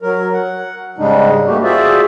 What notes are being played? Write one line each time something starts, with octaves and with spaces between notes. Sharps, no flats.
F#3 A#4
F#5
G#2 C#3 G3 G#3 D4 D#4
A3 A#3 F#4 G4
F4 F#4 G#4 C5 D5 E5